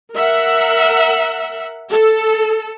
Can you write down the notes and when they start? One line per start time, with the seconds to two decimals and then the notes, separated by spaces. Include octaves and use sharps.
0.13 A#4 E5 F#5
1.91 A4